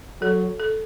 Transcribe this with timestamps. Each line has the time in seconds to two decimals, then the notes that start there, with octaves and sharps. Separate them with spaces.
0.22 F#3 A4
0.60 A4